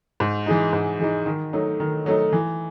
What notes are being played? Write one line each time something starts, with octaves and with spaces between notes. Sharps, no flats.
G#2
E3 G#3 D#4
G#2
E3 G#3 D#4
D#3
F#3 A3 D#4
D#3
F#3 A3 D#4
E3